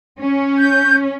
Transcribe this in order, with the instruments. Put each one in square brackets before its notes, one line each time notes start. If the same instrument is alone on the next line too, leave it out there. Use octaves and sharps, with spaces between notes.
[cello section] C#4
[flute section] G6